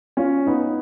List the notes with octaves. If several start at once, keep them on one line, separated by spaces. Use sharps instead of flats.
C#4 F4
B3 D#4